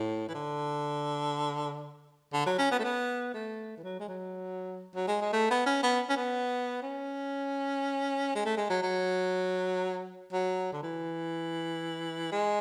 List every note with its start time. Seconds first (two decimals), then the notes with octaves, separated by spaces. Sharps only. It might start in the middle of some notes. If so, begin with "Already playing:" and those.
Already playing: A2
0.29 E3
0.34 D3
2.33 D3
2.46 F#3
2.58 C#4
2.71 B3
2.79 A3
2.84 B3
3.34 A3
3.77 E3
3.84 F#3
4.00 G#3
4.08 F#3
4.95 F#3
5.08 G#3
5.21 G#3
5.33 A3
5.51 B3
5.66 C#4
5.83 B3
6.09 C#4
6.17 B3
6.83 C#4
8.35 G#3
8.45 A3
8.57 G#3
8.70 F#3
8.82 F#3
10.33 F#3
10.73 D3
10.83 E3
12.32 G#3